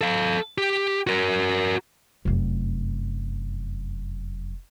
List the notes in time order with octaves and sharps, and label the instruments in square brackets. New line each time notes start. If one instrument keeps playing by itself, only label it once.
[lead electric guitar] A4 F5
G4
F#4 A#4
[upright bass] F1 F#2